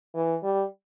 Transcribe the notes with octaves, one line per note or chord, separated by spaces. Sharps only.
E3
G3